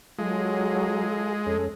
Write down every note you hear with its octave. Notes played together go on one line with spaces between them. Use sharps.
F#3 G#3 F4 G#4 A4
F2 C#4 A4